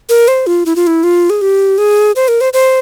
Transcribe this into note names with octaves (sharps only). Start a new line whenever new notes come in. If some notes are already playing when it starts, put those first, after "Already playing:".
A#4
C5
F4
E4
F4
E4
F4
G#4
G4
G#4
C5
A#4
C5
C5